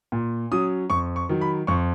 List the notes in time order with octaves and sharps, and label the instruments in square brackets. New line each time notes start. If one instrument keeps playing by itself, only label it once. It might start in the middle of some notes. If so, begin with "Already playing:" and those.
[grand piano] A#2
F#3 C#4 D#6
F2 C#6
C#6
D#3 F#3
B5
F2 C#6